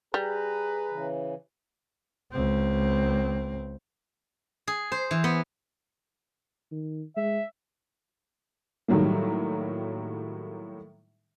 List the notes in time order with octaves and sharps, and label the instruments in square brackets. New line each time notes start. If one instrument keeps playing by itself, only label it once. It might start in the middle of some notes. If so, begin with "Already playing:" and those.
[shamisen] G3 [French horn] G#4 [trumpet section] B4 A#5
[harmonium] C#3 E3
[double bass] C#2 C4
[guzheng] G#4
C5
E3
B3
[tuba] D#3
[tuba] G#3 [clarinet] E5
[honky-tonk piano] A2 D#3 F#3 G3 A#3